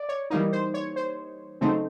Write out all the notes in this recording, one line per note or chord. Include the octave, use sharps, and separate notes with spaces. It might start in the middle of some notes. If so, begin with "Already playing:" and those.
Already playing: D5
C#5
E3 G3 A#3 D#4
C5
C#5
C5
C#3 F#3 A3 C4 D#4 C5